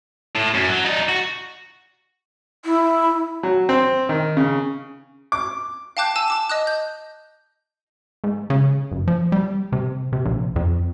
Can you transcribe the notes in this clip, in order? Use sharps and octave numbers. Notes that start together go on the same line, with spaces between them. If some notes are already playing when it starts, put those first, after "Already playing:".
A2
F#2
F#3
D#4 D5
F#4
E4
F#3
C4
D#3
C#3
D6
F5 G5 A5 D6 F#6 G6
G#5 A5 E6
A5 D6 E7
D#5 D#6 F#6
G6
G#2
C#3
F#1
F3
G3
C3
C3
A#1
F2